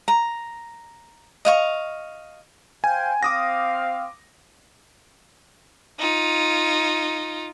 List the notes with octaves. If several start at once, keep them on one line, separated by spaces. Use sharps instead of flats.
A#5
D#5 F5 C#6
C5 F5 G5 G#5
C4 F5 D6 D#6 A#6
D#4 F4